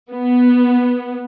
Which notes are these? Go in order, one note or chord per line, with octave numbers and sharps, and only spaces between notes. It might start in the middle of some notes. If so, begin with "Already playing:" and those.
B3